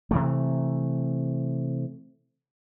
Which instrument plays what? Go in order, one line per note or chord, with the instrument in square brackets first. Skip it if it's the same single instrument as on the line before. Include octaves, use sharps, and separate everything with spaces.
[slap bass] C3 E3 A3